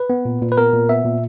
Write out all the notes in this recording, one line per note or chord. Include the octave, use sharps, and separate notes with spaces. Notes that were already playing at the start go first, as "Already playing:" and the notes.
Already playing: B4
B3
A#2
A#2
B4
B3 A#4
A#2
B3 E5
A#2